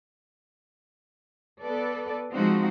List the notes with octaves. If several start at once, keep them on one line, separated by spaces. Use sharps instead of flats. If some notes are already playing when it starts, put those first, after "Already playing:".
B3 A4 B4 D5
F3 G#3 C4 D#4 F#4